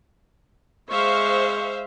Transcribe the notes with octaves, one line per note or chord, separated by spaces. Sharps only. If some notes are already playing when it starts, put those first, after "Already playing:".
G#3 C5 E5 F5 C#6